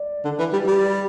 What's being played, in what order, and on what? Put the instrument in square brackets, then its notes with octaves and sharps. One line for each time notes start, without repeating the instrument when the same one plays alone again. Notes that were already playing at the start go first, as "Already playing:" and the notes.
Already playing: [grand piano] D5
[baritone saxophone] D3
E3
G3
G3